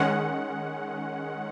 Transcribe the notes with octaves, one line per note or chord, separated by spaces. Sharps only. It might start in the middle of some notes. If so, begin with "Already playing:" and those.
Already playing: D#3 G#3 C#4 F#5